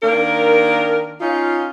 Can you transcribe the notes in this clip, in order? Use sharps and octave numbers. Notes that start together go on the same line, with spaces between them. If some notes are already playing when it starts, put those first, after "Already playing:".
D#3 A#3 D4 A#4
C#4 D#4 F4